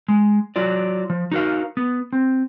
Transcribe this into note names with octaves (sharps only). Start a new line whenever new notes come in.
G#3
F#3 F4 D5
F3
D#4 F#4 A#4 F5
B3
C4